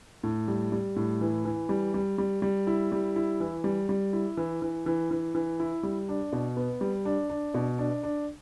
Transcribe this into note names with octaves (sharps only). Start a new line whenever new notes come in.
A2
G3
G3
A2
E3
E3
G3
G3
G3
G3
E4
G3
E4
E3
G3
G3
E4
E3
E3
E3
E3
E3
E4
G3
D4
B2
B3
G3
D4
D4
B2
D4
D4